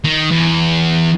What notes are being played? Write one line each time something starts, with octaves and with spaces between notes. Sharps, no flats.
D#3
E2